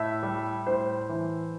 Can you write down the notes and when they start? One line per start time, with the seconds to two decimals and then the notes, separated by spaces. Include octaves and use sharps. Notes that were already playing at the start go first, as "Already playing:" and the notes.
Already playing: A2 E5
0.23 G3
0.67 A2 C5
1.09 E3